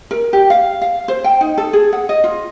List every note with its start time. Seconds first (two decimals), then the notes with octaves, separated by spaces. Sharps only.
0.11 A#4
0.33 G4
0.50 F5
0.82 F5
1.08 C5
1.24 G5
1.41 D#4
1.58 A4
1.73 G#4
1.93 F#5
2.09 D#5
2.24 F4